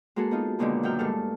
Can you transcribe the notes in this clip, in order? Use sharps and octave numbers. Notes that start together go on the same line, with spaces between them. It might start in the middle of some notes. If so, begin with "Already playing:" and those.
G#3 A#3 F#4 G#4 A4
B3 D#4 F4
B2 D3 D#3 G#3 A#3 B3
F#2 F#3 G5 F6
G2 G#3 A3 A4 F6